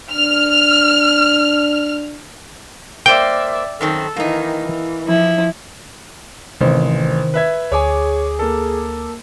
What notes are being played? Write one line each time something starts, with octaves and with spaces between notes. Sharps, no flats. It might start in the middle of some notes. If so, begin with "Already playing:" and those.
D4 F6
A#3 C5 D5 E5 G5
F#2 D#3 C4 A4
D#3 E3 A#3 D#4
E3
F3 E4
A1 C3 D#3 C5
B4 E5 G#6
D2 G#4 C#5 G#5 D6
A#3 A4